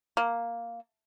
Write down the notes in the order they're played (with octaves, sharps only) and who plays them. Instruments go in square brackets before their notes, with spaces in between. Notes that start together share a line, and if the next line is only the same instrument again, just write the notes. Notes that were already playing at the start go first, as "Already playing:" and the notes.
[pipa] A#3